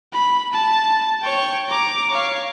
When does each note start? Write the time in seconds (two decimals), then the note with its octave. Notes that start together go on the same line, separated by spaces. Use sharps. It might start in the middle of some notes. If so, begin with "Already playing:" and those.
0.13 B5
0.53 A5
1.22 C#5 G5
1.69 A#5 D6
2.10 C#5 F5